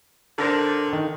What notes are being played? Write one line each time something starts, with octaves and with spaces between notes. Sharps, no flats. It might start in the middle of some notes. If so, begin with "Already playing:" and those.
D3 A4 A#4 C5
D#3